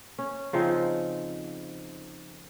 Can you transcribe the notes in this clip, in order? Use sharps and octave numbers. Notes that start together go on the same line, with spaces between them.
C#4
C#3 F3 C4 D#4